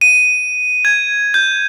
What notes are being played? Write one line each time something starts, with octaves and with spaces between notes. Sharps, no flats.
D#7
G#6
G6